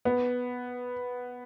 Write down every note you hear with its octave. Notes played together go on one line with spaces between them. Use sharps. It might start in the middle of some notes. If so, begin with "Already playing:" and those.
B3